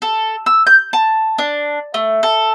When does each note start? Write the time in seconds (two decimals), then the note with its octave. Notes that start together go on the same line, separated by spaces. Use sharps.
0.02 A4
0.46 E6
0.67 G6
0.93 A5
1.38 D4
1.94 A3
2.23 A4